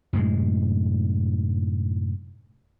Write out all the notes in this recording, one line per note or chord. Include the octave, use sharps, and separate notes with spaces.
F#2 A2 C3 G#3